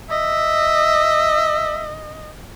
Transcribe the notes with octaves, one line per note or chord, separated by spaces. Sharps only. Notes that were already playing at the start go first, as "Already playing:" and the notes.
D#5 E5